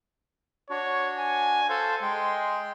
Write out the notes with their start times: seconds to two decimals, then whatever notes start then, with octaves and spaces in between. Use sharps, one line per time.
0.70 D4 F#4 C#5
1.18 G#5
1.69 A4 C5 F5
2.02 G#3 G5 C6